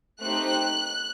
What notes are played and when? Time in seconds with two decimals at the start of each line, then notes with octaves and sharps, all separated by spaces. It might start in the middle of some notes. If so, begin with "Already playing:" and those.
0.20 A3 C4 D#4 G4 F#6